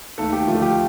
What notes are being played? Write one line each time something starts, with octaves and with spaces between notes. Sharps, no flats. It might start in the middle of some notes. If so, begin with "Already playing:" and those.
D#2 D#3 A3 A4
G4
D2 D3 F3 A3 F4
G4